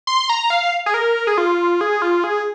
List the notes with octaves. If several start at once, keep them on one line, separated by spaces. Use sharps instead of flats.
C6
A#5
F5
G#4
A#4
G#4
F4
G#4
F4
G#4